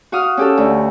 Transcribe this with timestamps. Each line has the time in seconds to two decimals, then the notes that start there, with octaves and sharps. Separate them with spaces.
0.12 F#4 F5 D#6 F6
0.37 C#4 G4 A4
0.57 D2